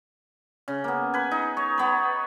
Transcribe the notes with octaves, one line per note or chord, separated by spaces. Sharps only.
C#3
A#3 B3
B4 G#5
D#4
C#5
B3 B5